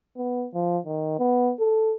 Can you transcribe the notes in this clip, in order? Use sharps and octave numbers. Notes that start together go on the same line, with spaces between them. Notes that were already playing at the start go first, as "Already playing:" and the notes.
B3
F3
D#3
B3
A4